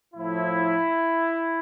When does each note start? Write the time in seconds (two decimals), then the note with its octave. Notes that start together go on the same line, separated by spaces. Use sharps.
0.14 A2 F3 E4